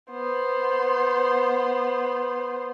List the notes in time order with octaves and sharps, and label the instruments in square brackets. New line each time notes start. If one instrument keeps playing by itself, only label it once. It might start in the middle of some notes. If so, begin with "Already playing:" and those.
[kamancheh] B3 C5